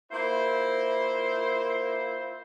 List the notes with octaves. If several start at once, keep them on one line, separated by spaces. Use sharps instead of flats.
A#3 E4 F4 C5